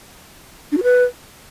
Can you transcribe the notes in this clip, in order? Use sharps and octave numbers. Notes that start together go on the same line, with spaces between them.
D4
F#4
B4